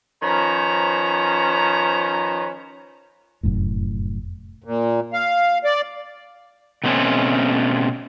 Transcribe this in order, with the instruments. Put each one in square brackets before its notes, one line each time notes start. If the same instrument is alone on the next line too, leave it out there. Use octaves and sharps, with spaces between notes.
[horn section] D#3 F3 C#4 B4 C5 A#5
[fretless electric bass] F1 F#2 A2
[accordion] A#2
F5
D5
[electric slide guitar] B2 A3 C4 C#4